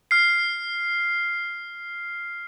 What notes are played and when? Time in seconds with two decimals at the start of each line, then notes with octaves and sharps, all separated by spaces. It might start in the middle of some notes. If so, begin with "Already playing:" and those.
0.11 F6 C7